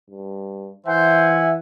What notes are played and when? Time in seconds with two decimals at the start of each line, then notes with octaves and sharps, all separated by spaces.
0.10 G2
0.86 E3 C5 E5 F#5 G#5